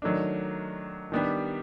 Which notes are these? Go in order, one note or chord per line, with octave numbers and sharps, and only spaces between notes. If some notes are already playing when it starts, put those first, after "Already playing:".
D#3 F#3 A3 D4
D#3 G3 B3 D4 G4